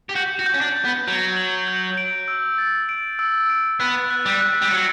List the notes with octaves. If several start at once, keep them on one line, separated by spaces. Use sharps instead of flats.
G4
F#4 G6
F#4
G6
C#4
D4
G6
B3
F#3 G6
F#7
G6
D7
E6
A6
D7
E6
D7
B3 F#6
F#6
G3
F#6
G3
F#3 C#7